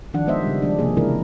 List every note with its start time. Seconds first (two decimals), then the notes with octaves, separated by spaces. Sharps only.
0.14 D#3 F3 D4 F#5
0.26 G#3 B3 C5 D#5 E5
0.43 C#3 G3
0.62 F3 G#3 D4
0.79 C3 F3 A#3 G#4
0.97 C#3 E3 G#3 D4 E4 A#4